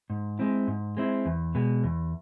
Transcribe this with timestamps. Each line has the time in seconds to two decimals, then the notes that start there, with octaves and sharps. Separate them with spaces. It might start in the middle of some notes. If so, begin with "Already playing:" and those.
0.10 G#2
0.39 G#3 C4 E4
0.68 G#2
0.97 G#3 C4 E4
1.25 E2
1.55 B2 G#3
1.84 E2